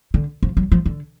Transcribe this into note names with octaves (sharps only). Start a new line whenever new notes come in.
D3
F3
F#3
F3
D3